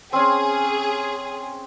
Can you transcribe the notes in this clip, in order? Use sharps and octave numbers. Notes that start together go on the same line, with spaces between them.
C4 C#4 G#4